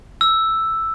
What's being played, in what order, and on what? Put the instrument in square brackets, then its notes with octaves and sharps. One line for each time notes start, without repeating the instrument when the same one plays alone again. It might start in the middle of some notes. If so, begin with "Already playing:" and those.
[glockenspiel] E6